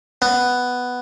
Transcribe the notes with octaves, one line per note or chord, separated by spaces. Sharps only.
B3